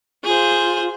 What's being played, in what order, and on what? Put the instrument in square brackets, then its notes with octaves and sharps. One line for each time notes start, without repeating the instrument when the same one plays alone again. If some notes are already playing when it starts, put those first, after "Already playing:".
[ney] F4 [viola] G#4 C5